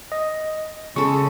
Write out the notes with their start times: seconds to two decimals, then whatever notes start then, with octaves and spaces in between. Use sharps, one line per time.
0.12 D#5
0.96 C#3 G#3 A4 C#6